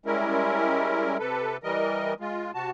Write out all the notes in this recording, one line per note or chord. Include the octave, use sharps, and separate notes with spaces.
G3 G#3 C#4 E4 A#4
C3 A4 B4
E3 G3 A#4 D#5
G#3 F4
C3 F#4 A5